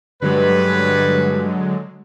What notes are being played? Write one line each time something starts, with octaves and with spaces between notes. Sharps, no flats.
G2 D3 F#3 G#3 B4